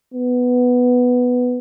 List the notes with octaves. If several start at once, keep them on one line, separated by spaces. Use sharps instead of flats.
B3